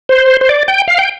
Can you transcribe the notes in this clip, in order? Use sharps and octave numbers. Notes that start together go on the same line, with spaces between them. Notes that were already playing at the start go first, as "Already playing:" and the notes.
C5
C5
D5
G5
F5
G5